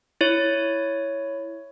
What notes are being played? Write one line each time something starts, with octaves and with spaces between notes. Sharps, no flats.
E4 C#5